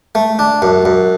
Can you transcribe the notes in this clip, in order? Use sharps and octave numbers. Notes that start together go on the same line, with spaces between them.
A3
D4
F#2
F#2